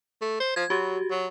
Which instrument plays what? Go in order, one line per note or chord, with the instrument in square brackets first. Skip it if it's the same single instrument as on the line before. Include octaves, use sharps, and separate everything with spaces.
[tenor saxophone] A3
C5
[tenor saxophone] F3 [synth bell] G#6
[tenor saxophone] F#3 [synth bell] F#4 G4
[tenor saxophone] F#3